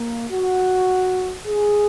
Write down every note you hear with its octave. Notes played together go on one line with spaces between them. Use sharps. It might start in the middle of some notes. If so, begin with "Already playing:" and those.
Already playing: A#3
F#4
G#4